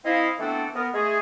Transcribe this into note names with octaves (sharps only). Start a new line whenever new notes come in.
C4 E4 D#5 F5
E3 A3 B3 C4 D4 A4
B3 A#4
G#3 A3 G#4